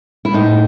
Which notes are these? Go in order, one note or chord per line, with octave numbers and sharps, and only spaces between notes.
E4
A2 D#4